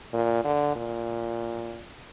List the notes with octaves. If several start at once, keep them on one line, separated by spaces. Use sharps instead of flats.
A#2
D3
A#2